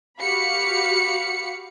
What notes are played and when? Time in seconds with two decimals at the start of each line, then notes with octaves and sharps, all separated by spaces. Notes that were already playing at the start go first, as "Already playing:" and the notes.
0.20 F#4 G4 F5 B5 C#7